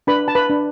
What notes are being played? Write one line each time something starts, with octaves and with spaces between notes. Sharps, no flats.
D4 B4 B5
A5
B4 B5
D4